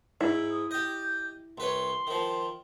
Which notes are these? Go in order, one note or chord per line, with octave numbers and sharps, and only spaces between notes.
G#2 E4
D#6
G4 D#5 G6
C2 B4 C#5 C6
D#3 F3